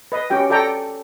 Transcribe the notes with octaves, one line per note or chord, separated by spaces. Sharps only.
B4 D#5
C#4 F#4 G4 G5
F#4 A4 D5 G5 A#5